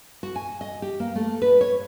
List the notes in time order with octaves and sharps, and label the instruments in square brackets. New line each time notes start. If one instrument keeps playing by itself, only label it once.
[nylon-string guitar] F#4
G#5
D#5
G4
A#3
A3
B4
C#5